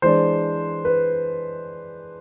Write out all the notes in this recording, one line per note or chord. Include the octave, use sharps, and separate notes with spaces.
E3 G#3 D4 C5
B4